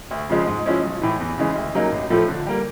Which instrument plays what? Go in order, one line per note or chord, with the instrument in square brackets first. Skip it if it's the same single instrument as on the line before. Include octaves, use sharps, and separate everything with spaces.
[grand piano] D2
C#3 F3 G#3
G#2
F3 G#3 C#4 E4
B1
A2 E3
E2
C#3 E3 G#3
D2
C#3 F#3 A#3 D#4
A1
A2 F3 A3
D3
G3 A#3